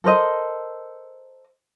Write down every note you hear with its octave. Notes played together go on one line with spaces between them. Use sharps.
A4 A#4 C5 D#5